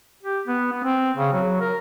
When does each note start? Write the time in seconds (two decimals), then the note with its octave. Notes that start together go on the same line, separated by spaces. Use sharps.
0.23 G4
0.47 B3
0.72 B3
0.84 C4
1.17 C#3
1.33 F#3
1.61 A#4